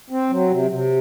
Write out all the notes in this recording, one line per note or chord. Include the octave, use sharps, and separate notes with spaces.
C4
F#3
C3
C3